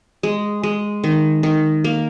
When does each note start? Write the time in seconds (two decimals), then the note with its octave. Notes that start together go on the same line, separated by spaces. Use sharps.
0.23 G#3
0.63 G#3
1.04 D#3
1.43 D#3
1.84 A#3